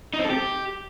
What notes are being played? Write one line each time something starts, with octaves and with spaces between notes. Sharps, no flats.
D#4
C4
A4
G4